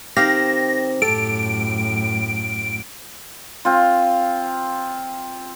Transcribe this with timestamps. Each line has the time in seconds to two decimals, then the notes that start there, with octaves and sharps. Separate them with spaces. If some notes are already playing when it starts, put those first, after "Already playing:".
0.17 D#3 C4 G4 F5 A#6
1.02 F#2 A2 G4 A4 D7
3.65 C4 F4